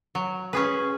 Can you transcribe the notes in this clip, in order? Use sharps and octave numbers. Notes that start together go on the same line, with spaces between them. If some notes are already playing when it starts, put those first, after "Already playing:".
F#3
C#4 G#4 B4